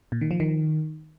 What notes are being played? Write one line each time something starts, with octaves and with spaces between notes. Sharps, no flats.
A#2
D#3
F3
D#3